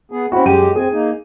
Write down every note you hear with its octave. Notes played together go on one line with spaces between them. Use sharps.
B3 G#4
C4 C#4 E4 F#4
F#2 G#3 G4 G5 D#7
C4 G#4 G#5
A#3 D#4